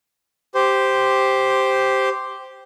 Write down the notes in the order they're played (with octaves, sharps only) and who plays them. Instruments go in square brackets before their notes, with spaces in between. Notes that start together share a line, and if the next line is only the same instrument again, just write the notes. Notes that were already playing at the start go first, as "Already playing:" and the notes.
[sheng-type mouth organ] G4 C5